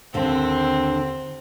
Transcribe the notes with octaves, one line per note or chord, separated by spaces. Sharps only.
D#2 D3 C4